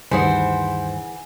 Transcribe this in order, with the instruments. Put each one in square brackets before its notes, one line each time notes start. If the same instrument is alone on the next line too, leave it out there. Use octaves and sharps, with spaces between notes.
[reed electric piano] D2 G2 D#3 [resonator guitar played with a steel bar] E3 G#4 F#5 [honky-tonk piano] C5 [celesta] G#5